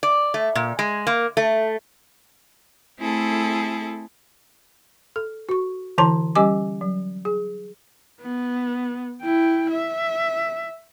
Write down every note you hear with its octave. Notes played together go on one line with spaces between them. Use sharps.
D5
A3
A#2
G#3
A#3
A3
A3 C4 E4 G#4 A4
A4
F#4 C#6
D3 E3 E4 C#5 A5 C6
G3 C#4 G4 D#5 G#5 D6
F#3
G#4
B3
E4 G5
E5